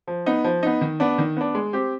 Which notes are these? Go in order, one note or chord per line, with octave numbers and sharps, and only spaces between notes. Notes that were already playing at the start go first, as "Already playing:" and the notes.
F3
B3 D#4
F3
B3 D#4
D#3
B3 D4
D#3
B3 D4
G#3
C4 G4